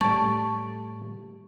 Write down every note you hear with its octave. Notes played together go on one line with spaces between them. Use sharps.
A2 G3 A3 G4 D5 A5 C#6